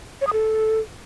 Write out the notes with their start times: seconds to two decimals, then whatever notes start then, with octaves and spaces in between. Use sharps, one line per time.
0.21 C#5
0.27 D#6
0.33 A4